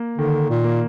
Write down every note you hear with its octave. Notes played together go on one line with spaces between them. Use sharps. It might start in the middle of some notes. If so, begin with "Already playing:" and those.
Already playing: A#3
D3 D#3
A#2
A#3